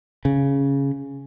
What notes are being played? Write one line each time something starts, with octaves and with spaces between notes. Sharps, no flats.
C#3